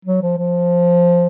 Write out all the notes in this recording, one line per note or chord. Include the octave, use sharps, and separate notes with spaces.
F#3
F3
F3